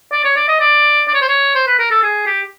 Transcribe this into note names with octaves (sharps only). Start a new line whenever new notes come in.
D5
C#5
D5
D#5
D5
D5
C#5
C5
C#5
C5
B4
A#4
A4
G#4
G4